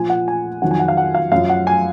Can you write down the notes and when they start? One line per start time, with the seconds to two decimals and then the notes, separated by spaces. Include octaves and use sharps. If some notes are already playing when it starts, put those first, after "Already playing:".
Already playing: A#2 F3 G#5
0.10 F#5
0.28 G#5
0.62 F2 D#3 F#3 F#5
0.71 G#5
0.79 F#5
0.88 F5
0.97 F#5
1.15 F5
1.32 F#2 F3 F5
1.49 F#5
1.67 G#5